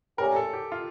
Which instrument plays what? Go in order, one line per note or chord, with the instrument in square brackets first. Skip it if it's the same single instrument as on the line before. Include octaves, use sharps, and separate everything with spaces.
[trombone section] A#2 A3 C#4 G4 [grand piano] A#4
[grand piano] A4
G4
F4